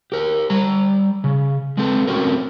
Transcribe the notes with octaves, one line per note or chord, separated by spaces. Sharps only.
G4 A#4
G3 A#5
C#3
G#3 C4 A4
A3 C4 C#4 F#4 A#4